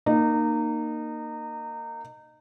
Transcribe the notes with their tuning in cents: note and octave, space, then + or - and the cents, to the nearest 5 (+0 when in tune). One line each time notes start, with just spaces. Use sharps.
A#3 -5 D#4 -25